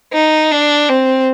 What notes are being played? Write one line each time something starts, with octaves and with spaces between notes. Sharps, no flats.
D#4
D4
C4